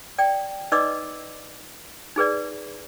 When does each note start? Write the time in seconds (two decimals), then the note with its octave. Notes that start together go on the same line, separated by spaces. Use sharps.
0.18 D5 G5
0.72 D#4 B4 D5 D#5 D6 E6
2.16 D#4 G#4 B4 D5